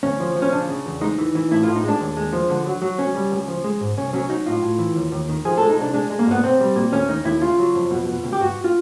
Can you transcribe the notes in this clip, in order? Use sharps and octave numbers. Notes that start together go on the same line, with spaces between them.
D2 C#4
F3
F3
C#4
C#3 D4
C#3
E2
G#3 D#4
E3
E3
A2 E4
A2 F4
D#4
G#3 D4
D#2
G#3
F3
D3
F#3
F#3
C#2 C#4
G3
C#2
F3
G#3
G#2
C2 C#4
F#3 C#4
F#3 D#4
A2 F4
A2
E3
D#2
D#2
D#3
F3 G#4
G#3 A4
D#4
C2 D4
G#3 D4
G#3
A#3
G2 B3
B1 C4
G3
A#2
D#2 C#4
D#2 D#4
D#2 E4
C#3 F4
F#3
F2
B2
B2
C#2
G4
G2 F#4
F4